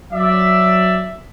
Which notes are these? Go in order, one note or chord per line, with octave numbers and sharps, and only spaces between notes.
F#3 D5 E5